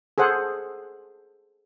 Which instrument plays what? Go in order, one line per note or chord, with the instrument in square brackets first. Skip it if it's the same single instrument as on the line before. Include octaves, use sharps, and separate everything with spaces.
[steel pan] G#4 A4 C5 F#5